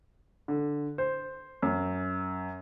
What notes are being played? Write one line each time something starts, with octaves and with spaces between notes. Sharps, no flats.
D3
C5
F#2